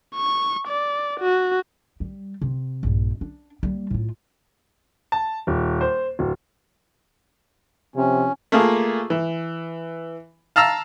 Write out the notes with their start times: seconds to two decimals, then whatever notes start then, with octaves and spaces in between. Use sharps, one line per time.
0.16 C#6
0.68 D5
1.21 F#4
2.00 G3
2.42 C3
2.83 A#1 G2
3.21 D4
3.63 G3 A#3
3.90 A2 F4
5.12 A5
5.47 D#1
5.81 C5
6.19 D1
7.96 C3 F3 C#4
8.52 A3 A#3 F4 G#4
9.10 E3
10.56 F5 A5 A#5 E6 F6